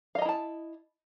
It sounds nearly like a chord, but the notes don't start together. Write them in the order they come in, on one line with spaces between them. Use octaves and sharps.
F5 D#5 A#5 E4 A5